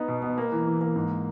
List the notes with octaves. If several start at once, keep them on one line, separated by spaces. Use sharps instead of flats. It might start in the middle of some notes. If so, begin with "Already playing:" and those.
Already playing: B3 D#4
B2
B3
A#3
E3
E3
A#3
G#2